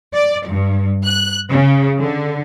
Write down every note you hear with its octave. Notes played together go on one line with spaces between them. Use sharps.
D5
G2
F#6
C#3
D3